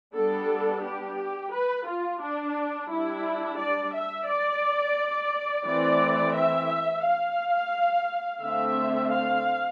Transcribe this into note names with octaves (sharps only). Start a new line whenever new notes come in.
G3 B3 D4 A4
G4
B4
F4
D4
G3 D4 E4
D5
E5
D5
E3 A3 C4 D5
E5
F5
D3 A3 C4 E5
F5